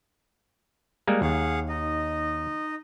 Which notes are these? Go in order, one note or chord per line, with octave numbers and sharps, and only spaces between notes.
G3 G#3 A#3
D#2 G#4 F5 F#5
D#4 D#5